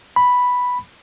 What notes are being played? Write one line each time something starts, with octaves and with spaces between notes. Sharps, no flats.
B5